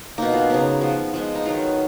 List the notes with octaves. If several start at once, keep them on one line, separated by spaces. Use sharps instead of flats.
B2 A#3 D#4
F4
C#3 F#3 B3
F3 B3
F3 G#3 B3
D#4
D#3 F#3 B3 F4